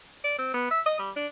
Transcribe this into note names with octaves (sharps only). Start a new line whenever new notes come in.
D5
C4
B3
E5
D#5
G3
D4